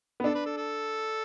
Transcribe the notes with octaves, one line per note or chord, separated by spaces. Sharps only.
B3
D4 A4
B4
A4
A4